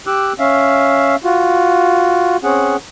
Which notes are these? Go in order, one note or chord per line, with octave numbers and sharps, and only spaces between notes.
G4 D6 E6 F#6
C#4 E5 F5
F4 F#4
C4 C#4 G#4 F#5